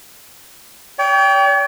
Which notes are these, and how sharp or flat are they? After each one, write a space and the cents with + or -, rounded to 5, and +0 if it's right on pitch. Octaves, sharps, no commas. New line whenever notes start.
C#5 +45 G5 +0